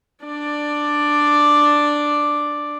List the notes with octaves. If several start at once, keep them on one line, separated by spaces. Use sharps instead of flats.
D4 D5